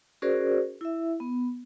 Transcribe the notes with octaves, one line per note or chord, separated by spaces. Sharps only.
C#4 F#4 G#4 A#4 C5 D5
E4 E5
B3